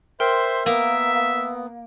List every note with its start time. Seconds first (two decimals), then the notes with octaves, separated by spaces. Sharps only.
0.20 A#4 C5 E5 G5 C6
0.66 A#3 B3 E5